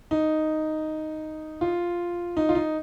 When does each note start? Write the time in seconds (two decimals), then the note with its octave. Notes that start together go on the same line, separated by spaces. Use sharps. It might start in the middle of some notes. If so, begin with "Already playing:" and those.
0.11 D#4
1.61 F4
2.37 D#4
2.49 F4
2.55 D#4